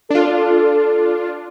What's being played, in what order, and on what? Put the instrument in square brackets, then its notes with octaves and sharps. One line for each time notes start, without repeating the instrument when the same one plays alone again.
[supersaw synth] D4 F4 [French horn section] A4